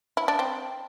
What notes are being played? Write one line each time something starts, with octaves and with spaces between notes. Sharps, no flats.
E4
D4
C4